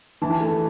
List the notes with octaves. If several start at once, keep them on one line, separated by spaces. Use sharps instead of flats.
E3 A5
A3